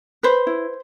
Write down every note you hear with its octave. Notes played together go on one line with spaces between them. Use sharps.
B4 C5
E4